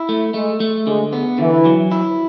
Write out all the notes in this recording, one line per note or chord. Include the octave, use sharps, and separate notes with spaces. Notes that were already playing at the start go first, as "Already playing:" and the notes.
Already playing: E4
A3
G#3 A3
A3
D3 G#3
B3
D3 E3
F#3
E4